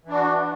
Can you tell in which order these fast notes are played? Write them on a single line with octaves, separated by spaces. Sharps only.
E3 D4 F#4